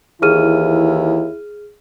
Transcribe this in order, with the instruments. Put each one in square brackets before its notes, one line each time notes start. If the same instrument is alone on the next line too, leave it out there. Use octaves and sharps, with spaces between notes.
[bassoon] D#2 [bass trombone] E3 [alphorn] E4 [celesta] G#4 F6 D#7